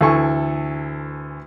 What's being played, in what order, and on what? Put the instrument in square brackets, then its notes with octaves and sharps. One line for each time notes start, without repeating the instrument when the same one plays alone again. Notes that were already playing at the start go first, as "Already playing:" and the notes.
[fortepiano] D2 E3 A4 G#5 C#6